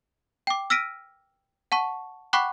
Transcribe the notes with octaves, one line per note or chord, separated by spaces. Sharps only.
G5 D6
E6 F6 A#6 B6 D7 D#7
F#5 A5 C#6
F#5 G5 B5 C#6 D6 F#6